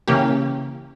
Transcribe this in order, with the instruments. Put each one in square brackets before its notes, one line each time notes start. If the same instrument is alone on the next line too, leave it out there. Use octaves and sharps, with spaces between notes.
[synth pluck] C#3 E3 A#3 G4